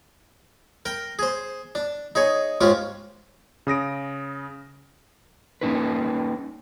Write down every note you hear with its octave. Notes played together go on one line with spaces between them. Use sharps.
A#4 G5
G#4 C5
D4
D#4 G#4 C#5
G#2 G#3 C#4 F4 G4
C#3 D#6 A#6 D7
A#3 C#4 D#4 B4